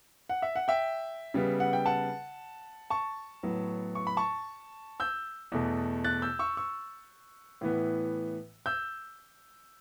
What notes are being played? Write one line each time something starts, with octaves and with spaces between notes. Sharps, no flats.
F#5
E5
F#5
E5 G5
C#3 G3 B3
F#5
G5
F#5 A5
A5 C#6
A2 F#3 B3
C#6
B5
A5 C#6
E6 G6
E2 B2 A3
F#6 A6
E6 G6
C#6 E6
C#6 E6
A2 E3 B3
E6 G6